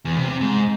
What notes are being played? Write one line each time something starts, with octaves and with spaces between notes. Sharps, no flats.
E2
C3
C3
G#2